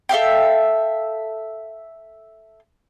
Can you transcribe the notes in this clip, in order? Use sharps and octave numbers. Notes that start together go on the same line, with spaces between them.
A4 E5 F5 G5